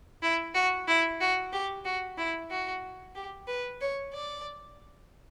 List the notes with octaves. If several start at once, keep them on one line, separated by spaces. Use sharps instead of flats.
E4
F#4
E4
F#4
G4
F#4
E4
F#4
G4
B4
C#5
D5